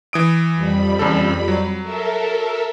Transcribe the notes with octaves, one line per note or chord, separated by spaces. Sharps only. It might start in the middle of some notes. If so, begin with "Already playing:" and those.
E3 D#6 D7
F2 G3 B5
E2 C#3 A4
F#3
A4 A#4 E5